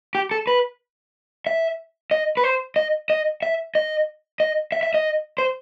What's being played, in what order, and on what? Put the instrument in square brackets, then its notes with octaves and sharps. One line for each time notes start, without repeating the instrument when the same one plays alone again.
[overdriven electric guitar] G4
A4
B4
E5
D#5
B4
C5
D#5
D#5
E5
D#5
D#5
E5
E5
D#5
C5